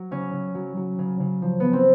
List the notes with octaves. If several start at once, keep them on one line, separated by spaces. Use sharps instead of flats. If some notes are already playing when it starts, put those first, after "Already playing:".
Already playing: F#3
C#3 C#4
C#3
F#3
F#3
C#3
C#3
F3
F3 B3
C4